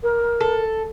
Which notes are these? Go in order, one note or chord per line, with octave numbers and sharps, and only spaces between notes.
A#4
A4